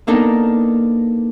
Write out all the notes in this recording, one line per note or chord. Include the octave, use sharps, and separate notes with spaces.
A#3 B3 D4 D#4 A4 A#4